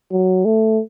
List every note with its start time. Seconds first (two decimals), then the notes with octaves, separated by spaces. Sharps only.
0.12 F#3
0.45 A3